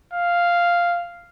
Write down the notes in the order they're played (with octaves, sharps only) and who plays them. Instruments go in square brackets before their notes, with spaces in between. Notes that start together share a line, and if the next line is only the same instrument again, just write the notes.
[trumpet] F5